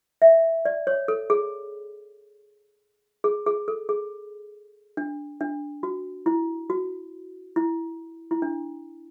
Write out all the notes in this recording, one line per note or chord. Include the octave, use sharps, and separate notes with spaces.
E5
D5
C#5
A4
G#4
G#4
G#4
A4
G#4
D4
D4
F#4
E4
F#4
E4
E4
D4